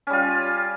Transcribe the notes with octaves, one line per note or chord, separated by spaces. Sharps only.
G3 C#4 F4